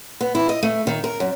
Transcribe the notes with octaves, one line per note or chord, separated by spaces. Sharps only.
B3
E4
D#5
A3
D#3
A#4
F#2